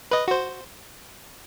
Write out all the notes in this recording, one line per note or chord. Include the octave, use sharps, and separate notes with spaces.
B4 D#5
F#4 C5